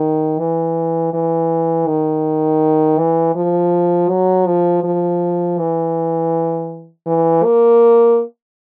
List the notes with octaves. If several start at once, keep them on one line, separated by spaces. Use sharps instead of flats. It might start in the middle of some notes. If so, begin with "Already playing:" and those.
Already playing: D#3
E3
E3
D#3
E3
F3
F#3
F3
F3
E3
E3
A#3